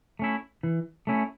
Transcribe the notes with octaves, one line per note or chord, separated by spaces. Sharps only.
A3 C#4 E4
E3
A3 C#4 E4